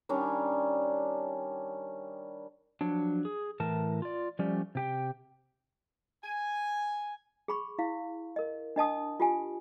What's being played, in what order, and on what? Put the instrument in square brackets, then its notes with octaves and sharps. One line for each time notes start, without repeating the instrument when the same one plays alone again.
[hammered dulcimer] D#3 G3 C#4 D4
[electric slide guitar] F3 F#3 D4
G#4
A2 E3 A#4 A5
F4 D5
F3 G3 A3 C#4 G4 D5
C3 G4 G5
[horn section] G#5
[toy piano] G#4 B5 C#6
E4 F5
A#4 D#5
D4 D#5 A5 D#6
F4 G4 G#5